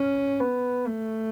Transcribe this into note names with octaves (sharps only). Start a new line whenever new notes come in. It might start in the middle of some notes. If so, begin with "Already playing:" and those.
Already playing: C#4
B3
A3